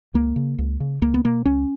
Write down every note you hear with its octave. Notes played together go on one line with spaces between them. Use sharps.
C#2 A#3
C#3
C#2
C#3
C#2 A#3
B3
B2 A#3
C#2 C#4